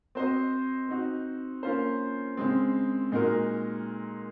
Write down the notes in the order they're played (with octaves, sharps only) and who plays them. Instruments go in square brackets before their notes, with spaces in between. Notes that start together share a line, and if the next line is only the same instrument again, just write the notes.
[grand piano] C4 F#4 C5 D#5
C4 D#4 F#4
A#3 C#4 F4 C5
C#3 G#3 C4
A#2 G#3 D#4 F#4 A#4